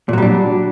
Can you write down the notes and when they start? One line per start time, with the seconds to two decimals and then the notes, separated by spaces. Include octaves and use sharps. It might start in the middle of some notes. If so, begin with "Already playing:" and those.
0.09 A#2
0.13 F#3
0.18 G3
0.22 D4